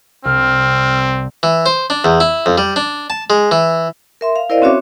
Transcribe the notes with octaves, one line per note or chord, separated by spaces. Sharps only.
C2 C4 F6
E3
C5
D4
E2
E4
F2
G3
D4
A5
G#3
E3
A#4 E5 C6
F5
E4 A#4 C5 D5 D#5 F5
C4 C#4 F#4 C#5 E5 D6